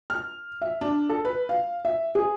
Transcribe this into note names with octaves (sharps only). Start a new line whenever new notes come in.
F6
E5
D4
A4
B4
F5
E5
G#4